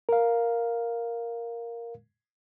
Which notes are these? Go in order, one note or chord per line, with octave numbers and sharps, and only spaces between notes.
A#4 F5